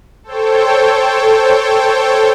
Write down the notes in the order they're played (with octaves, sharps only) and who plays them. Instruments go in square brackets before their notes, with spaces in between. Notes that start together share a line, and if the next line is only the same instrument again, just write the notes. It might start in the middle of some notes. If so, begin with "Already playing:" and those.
[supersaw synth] A4 C5 C#5 G5